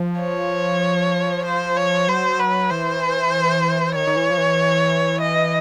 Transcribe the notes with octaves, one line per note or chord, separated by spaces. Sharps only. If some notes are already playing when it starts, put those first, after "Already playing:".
Already playing: F3
C#5
C5
C#5
F#3 C5
B4
E3 C5
D#3 C#5
D#3
E3
F3
E3
D#5